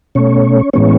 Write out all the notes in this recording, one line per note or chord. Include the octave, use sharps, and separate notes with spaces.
B2 A3 C#4 C#5
A2 E3 G#3 B3 C#4 C#5